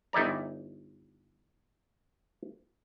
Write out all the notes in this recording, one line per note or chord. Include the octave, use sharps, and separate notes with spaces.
G1 D#4 E4 D5 A#5